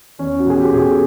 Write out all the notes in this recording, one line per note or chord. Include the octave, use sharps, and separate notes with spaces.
E2 C#4
F#4
B2 G#4
G4
B2 G#4
A4